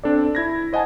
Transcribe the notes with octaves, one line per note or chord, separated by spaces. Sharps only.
C4 D4 A4 D5
E4 G#6 A#6
C5 D#5 F#5 G#5 A5